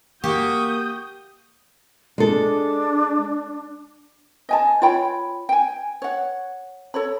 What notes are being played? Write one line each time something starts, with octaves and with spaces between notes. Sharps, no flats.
A#3 F#4 G4 D#6 G6
G#3 D4 A4
D#5 G#5 A5
F4 C#5 G5 B5
G5 G#5
C#5 F#5
A4 C#5 B5